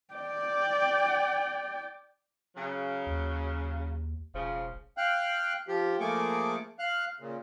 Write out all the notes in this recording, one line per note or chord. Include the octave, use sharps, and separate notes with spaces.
D5 G5
C#3 F#3
D#2
E1 C#3 F3
F5 G5 F#6
F3 G4
F3 A3 A#3 G#4 C#6 D6
F5 F#6
A#2 C#3